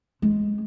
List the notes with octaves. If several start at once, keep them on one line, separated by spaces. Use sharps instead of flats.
G#3